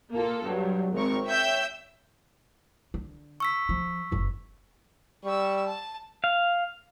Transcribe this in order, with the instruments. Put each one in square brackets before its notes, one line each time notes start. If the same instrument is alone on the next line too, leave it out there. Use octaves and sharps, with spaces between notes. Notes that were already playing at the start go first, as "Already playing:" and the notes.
[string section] A#3 F4 A4
G2 F#3
G#1 C4 A#4 C#6
C#5 E5 G5 E6 G6
[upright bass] D3
[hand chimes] C#6 E6 B6
[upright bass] F3
F#1 E2
[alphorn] G3 [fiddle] C#6 E6
[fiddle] A5
[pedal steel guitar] F5